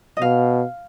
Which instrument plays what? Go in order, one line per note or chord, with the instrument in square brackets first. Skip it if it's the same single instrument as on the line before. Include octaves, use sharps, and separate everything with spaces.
[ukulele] D#5
[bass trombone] B2 [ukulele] F5